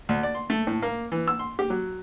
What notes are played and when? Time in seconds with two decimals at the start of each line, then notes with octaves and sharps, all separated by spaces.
0.09 D2
0.23 D5
0.35 C6
0.50 A3
0.67 A2
0.82 A#3
1.12 E3
1.28 E6
1.39 C6
1.59 G4
1.70 F#3